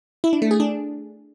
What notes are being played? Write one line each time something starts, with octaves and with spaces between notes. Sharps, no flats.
E4
D4
A3
G#4
D4